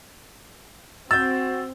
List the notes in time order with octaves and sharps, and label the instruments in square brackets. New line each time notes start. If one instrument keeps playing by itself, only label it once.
[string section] C4 [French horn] F#4 [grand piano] E6 G6 [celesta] A6